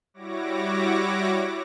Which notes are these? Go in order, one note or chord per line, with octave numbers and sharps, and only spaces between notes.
G3 E4 F#4 C#5 D6 A#6